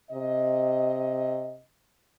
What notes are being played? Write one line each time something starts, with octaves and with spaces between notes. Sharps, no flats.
C3 D#5